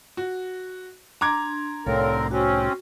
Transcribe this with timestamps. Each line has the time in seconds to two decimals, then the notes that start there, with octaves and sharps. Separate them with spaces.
0.17 F#4
1.21 D4 A#5 C6 D6 G#6
1.86 C2 A2 D3 C4 A4 A#4 C#5 F5
2.31 C4 C#4 F#4